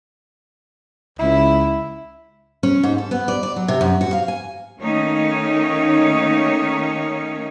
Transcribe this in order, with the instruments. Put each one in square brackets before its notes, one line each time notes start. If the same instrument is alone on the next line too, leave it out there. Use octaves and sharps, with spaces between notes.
[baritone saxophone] C#2 [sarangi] E4
[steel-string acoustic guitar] C#4
G#2
A4
B3
D5
D5
F#3
C3
F#2
F#4
F5
G#5
[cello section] D#3 A3 A#3 C#4 D#4 C#5